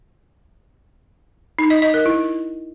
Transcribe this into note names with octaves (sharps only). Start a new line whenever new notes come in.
D#4
D#5
D#5
A#4
E4